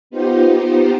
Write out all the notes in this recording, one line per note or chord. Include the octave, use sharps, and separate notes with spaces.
B3 D#4 F4 G4 C5